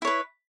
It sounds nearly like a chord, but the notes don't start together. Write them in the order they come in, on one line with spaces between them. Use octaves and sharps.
E4 C#5 B4